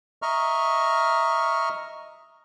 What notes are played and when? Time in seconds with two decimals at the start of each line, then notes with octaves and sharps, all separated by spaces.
0.22 D#5 E5 A#5 C#6 F6